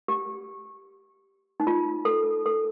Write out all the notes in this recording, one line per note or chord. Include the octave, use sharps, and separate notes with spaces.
G4
D#4
F4
A4
A4